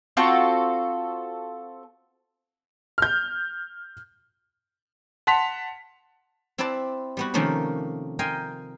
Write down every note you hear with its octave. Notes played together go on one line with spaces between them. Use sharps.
C4 F4 F#4 A4
F6 G6
F#5 A5 C6 B6 F7
C4 E4 B4 D5 A5
G3 B3 F#4
C3 D#3 F3 A3 A#3 C#4
A#4 D#5 F5 G5 G#5 C6